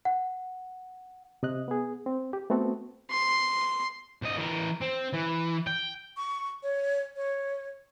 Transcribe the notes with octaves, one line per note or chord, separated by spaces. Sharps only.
F#5
C3 D#5 F#6
B3 G#4
C4
G4
A3 B3 C4 F#4 A4
C6
C2 D#5
E3 A#4
C4
E3
G5
C#6
C#5
C#5